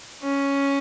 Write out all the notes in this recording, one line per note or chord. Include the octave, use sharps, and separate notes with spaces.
C#4